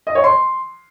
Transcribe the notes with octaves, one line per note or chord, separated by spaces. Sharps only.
D#5
C#5
C6